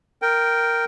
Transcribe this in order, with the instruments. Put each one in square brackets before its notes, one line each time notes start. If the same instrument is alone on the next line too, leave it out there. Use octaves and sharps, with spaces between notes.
[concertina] A#4 G5